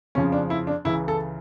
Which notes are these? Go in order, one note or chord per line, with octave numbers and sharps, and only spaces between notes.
F2 C#3 F3 C#4
D4
E4
D4
C#2 C#3 E3 E4
A4